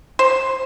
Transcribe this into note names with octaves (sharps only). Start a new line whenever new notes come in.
C5